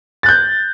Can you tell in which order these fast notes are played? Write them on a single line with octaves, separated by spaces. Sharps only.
A6 F#6 G6